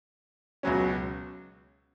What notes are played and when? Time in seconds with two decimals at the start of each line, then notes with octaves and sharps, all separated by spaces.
0.63 C#2 B2 F#3 C#4